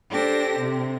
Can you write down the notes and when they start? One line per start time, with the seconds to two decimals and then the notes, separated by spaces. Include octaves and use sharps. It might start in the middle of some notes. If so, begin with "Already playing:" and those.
0.11 D4 G4 A4 C5 A#6
0.59 C3